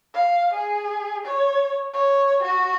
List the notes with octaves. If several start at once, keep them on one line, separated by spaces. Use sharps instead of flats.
F5
G#4
C#5
C#5
F#4